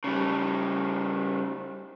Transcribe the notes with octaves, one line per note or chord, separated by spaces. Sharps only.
C#3 G3